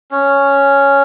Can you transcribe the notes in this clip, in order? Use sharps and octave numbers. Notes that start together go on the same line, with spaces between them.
C#4